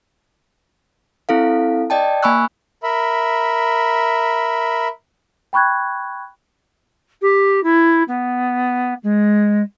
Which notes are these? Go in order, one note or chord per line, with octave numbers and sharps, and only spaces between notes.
C4 E4 A4 F5
D5 D#5 G5 A5
A#3 G#5 B5 C#6 E6 F#6
A#4 E5 B5
G5 B5 C#6 F#6 G#6
G4
E4
B3
G#3